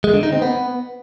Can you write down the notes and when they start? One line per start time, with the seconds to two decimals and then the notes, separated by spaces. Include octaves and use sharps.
0.04 G#3
0.14 D3
0.23 D#4
0.32 C4
0.42 B3